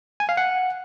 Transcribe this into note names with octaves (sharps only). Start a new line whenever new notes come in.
G#5
F5
F#5